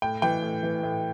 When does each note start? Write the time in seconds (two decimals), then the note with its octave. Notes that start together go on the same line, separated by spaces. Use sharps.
0.02 A2 G5
0.22 E3 G5
0.43 A2
0.63 E3
0.83 A2